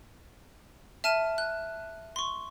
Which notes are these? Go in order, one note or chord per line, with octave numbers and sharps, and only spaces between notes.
E5 A5 F6 D#7
F#6
C6 C#6